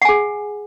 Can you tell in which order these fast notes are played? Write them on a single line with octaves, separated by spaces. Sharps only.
F#5 G#5 G#4